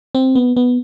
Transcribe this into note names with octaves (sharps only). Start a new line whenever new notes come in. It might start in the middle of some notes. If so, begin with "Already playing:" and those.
C4
B3
B3